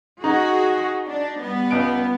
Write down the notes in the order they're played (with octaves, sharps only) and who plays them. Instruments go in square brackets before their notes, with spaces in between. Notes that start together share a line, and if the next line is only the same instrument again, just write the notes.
[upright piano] D#4 [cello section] F#4 G#4
[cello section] D4
G3 B3
[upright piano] C#2 D7